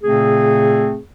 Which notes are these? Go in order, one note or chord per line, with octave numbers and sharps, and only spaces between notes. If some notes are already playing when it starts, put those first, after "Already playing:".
A#2 C#3 A3 C4 G#4